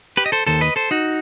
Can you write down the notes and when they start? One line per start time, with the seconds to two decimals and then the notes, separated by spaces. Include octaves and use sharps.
0.17 G4 B4
0.26 D#5
0.32 A4 C5
0.47 D#2 D#3 A4 C5
0.61 B4 D#5
0.76 A4 C5
0.91 D#4 F#4